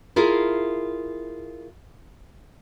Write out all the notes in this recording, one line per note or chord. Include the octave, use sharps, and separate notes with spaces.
E4 F4 G#4 A#4